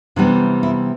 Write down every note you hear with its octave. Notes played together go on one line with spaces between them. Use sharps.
C3 E3 G3 B3 D4
E4